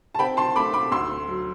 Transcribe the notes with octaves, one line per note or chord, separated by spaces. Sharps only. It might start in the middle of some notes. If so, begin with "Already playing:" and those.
A5
C4 G5 B5
A5 C6
A3 B5 D6
B5 D6
D2 C6 E6
F#3